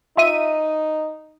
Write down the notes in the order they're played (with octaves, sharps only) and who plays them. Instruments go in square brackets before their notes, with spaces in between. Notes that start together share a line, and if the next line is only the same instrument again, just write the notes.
[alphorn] D#4 [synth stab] F4 E5 D#7